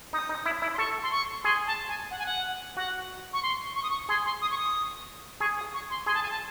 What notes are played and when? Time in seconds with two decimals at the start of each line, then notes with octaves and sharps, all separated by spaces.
0.13 D#4 D#6
0.29 D#4
0.46 E4
0.62 E4
0.74 C6
0.78 A4 C#6
1.03 C6
1.12 C#6
1.44 G#4 C6
1.67 A5
1.88 G#5
2.11 F#5
2.19 G#5
2.26 F#5
2.76 F#4 F#5
3.33 C#6
3.43 C6
3.76 C#6
3.83 D#6
3.90 C#6
4.09 G#4 C6
4.25 C6
4.41 D#6
4.51 C#6
4.58 D#6
5.40 G#4 C#6
5.57 D#6
5.73 C#6
5.90 C6
6.06 G#4 C6
6.14 A5
6.23 G#5
6.31 A5